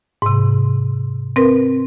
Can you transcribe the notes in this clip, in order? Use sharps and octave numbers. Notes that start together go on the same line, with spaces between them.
G#2 C3
C4 A#4 B4